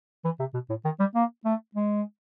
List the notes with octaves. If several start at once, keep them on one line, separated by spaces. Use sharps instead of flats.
E3
C3
B2
A2
D#3
G3
A#3
A3
G#3